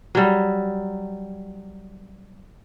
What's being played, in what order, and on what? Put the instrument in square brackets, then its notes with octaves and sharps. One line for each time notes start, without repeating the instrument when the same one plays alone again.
[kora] F#3 G3